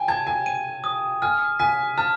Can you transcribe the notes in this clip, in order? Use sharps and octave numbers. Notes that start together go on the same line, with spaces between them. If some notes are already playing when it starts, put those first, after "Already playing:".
Already playing: G5 G#5
A5 G#6
G#5
D#7
D#6
G#5 F6
G#5 B6
A5 F6